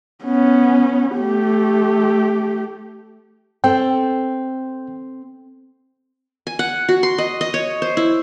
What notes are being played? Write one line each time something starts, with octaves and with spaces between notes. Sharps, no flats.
B3 C#4
A3 G4
C4 A4 C5 G5
G#5
F#5
F#4
C6
D#5
D#5
C#5
C5
E4